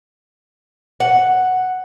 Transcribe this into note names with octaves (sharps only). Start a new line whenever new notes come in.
F#5